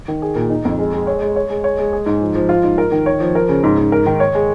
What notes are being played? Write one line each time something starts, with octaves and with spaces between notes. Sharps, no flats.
D#3
G#4
A#2
D#4
F2
G#3
G#3
C#5
G#3
C#5
G#3
C#5
G#3
G#4
G#2
F3
F3
F4
G#2
A#4
D#3
C#5
F3
A#4
C#3
G#2
G#2
A#4
D#3
C#5
G#3